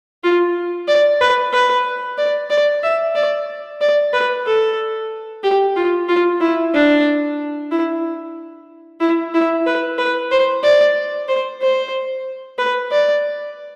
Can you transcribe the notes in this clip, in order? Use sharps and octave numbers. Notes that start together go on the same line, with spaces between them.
F4
D5
B4
B4
D5
D5
E5
D5
D5
B4
A4
G4
F4
F4
E4
D4
E4
E4
E4
B4
B4
C5
D5
C5
C5
B4
D5